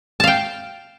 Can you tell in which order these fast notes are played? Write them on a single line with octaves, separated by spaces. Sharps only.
A5 F5 G5